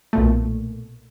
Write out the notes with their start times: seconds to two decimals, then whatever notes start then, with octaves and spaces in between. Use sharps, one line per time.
0.13 B1 A#2 A3